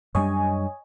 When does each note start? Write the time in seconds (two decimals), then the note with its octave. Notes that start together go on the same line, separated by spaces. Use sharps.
0.15 F#2 G3 D4 C#5 D#5 G#5